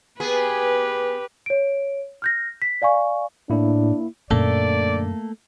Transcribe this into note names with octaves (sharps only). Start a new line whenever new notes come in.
B3 G4 G#4 B4
C#5 D7
F6 G6 A#6
B6
D5 F5 G#5 C#6
A2 A#3 D4 E4
F#2 A#2 D3 A3 A#3 A4 D5